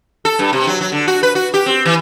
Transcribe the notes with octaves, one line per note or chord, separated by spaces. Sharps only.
A4
G2
C3
F#3
F#3
D3
F#4
B4
F#4
G4
C4
E3